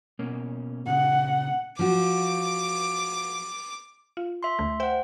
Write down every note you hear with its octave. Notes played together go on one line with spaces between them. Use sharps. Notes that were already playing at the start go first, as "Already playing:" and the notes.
B2 A#3 C#4
A#2 C#3 F#5
F3 F#4 D6
F4
E5 C6
D2 A3
C5 E5 F#5 G5